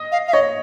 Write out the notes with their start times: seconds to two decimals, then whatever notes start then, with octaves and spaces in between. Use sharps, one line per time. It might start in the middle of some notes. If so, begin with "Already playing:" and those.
Already playing: D#5
0.12 F5
0.28 F5
0.33 C#5 D#5